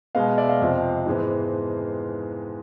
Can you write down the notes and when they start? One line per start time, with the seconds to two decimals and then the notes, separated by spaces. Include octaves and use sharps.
0.15 B2 G#3 B3 D#5 F5
0.38 D5 E5
0.49 D#5 F5
0.61 F2 C3 F3
1.06 G#2 E3 G#3 B3